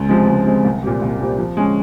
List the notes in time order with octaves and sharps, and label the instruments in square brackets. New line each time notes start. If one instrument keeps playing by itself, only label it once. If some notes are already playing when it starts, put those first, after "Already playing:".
Already playing: [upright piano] C#2
C3 F3 G#3 C4
C#2
C3 F3 G#3 C4
C2
A#2 G3 C4 G4
C2
A#2 G3 C4 G4
F3
G#3 C#4